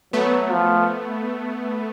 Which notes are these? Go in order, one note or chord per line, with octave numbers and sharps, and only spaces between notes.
F#3 A3 B3
F3